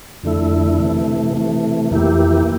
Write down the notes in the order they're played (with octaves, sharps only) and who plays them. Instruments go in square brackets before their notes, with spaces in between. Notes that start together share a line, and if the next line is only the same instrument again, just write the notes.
[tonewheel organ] F2 D3 A3 E4
C3 E3 A3
C3 E3 A3
F2 E3 A#3 E4 G4